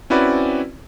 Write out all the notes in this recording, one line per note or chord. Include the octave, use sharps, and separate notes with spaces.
C4 C#4 E4 F#4 B4 D5